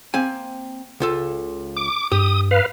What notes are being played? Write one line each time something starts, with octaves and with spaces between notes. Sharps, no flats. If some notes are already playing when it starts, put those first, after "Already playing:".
A#3 C4 G#5
C#2 F4 A4
D6
G2 G4 D#6
B4 F5